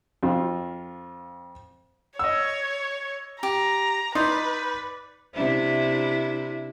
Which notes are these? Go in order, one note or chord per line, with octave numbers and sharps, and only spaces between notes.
F2 F4
C#5 D#5 E6
G4 A#5
D#4 B4 D5 C6
C3 D4 E4